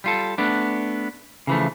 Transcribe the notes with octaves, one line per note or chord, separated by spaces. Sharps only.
G3 F4 A4
A3 B3 D4
C#3 E3 F3 A3